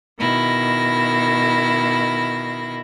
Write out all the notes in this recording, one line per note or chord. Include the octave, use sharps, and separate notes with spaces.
B2 D#3 E4 A#6